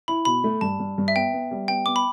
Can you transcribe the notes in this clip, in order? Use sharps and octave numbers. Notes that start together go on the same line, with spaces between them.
E4 B5
B2 B5
A3
G2 A5
G2
G2
E5
B3 G5
B3
G3
B3 G5
B3 D6
B5